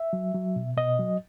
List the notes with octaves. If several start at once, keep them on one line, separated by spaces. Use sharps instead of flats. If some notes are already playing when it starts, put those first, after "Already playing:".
Already playing: E5
F#3
F#3
B2
B2 D#5
F#3